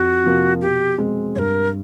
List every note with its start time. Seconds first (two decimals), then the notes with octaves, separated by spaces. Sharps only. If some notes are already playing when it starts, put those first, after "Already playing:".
Already playing: F2 F#4
0.24 C3 F3 A#3
0.61 B2 G4
0.98 G#3 C4
1.35 G2 A#4 C#5